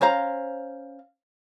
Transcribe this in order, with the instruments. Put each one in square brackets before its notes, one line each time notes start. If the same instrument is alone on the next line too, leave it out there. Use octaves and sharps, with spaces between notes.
[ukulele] C#4 C5 F5 A#5